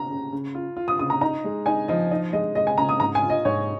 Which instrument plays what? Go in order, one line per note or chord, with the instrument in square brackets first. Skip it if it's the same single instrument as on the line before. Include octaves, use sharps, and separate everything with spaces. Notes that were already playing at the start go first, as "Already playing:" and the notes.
Already playing: [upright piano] A#5
[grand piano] C#3
C#3
F4
F4
[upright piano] D#6
[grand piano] C#3 [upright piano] D#6
[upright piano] A#5
[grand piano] D#4 [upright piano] A#5
[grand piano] G#3
[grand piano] D#4 [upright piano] G#5
[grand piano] F3 [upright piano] D#5
[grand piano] D#4 [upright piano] D#5
[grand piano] G#3 [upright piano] D#5
[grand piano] G#3 [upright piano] D#5
[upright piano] G#5
[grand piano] C#3 [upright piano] A#5
[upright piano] D#6
[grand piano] G#2 [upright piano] A#5
[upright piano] G#5
[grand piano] F4
[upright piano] D#5
[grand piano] G#2 [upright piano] C#5